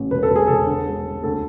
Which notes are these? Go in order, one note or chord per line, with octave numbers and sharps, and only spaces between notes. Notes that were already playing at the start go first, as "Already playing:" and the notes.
Already playing: A1
E1 B4
A4
E1
G#4
E1 A4
D3
G#3
G#3
D2 A4